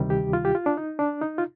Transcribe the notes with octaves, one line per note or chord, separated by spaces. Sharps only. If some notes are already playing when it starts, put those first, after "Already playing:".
Already playing: D2 C3 D#3 G3
G4
F4
G4
F4
D4
D#4
D4
D#4
F4